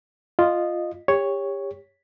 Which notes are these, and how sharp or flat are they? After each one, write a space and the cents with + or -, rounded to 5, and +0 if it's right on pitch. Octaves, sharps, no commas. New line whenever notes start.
F4 +0 D#5 -15
G4 +30 C#5 +0